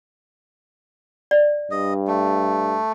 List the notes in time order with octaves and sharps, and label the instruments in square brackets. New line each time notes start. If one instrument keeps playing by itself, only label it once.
[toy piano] D5
[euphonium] G2 [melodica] D#5
[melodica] A3